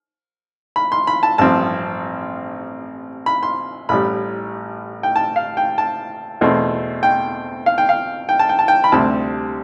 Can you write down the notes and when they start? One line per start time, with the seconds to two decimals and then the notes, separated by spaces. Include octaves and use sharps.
0.76 B5
0.92 C6
1.07 B5
1.23 A5
1.38 A1 G2 F3 C4 A5
3.26 B5
3.43 C6
3.89 A1 A2 G3 B5
5.03 G5
5.16 A5
5.36 F5
5.57 G5
5.78 A5
6.41 E2 B2 A3 C4
7.03 G5
7.66 F5
7.78 G5
7.89 F5
8.29 G5
8.39 A5
8.49 G5
8.59 A5
8.68 G5
8.84 B5
8.92 D2 C3 G3 C4 A5